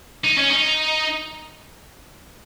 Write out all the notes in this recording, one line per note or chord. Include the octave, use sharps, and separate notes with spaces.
D#4
C#4
D#4